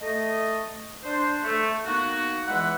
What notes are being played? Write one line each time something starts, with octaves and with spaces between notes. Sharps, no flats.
A3 D#5
D4 C5
A3
A#3 B3 D#4 F#4
E2 E3 G#3 B4 E5 F#5